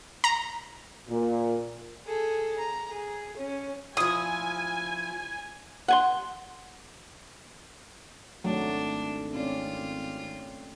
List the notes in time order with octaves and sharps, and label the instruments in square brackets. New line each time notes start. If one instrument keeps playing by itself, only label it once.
[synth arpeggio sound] A#5
[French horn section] A#2
[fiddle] G#4 A4
A#5
G#4
C#4
[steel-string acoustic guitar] F3 E4 [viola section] G#5 [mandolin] D#6
[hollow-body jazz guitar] F#5 G#5 C6
[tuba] G#1 [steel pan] F#3 [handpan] A3 [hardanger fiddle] D4
[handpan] C4 C#4 D5 [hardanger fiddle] F4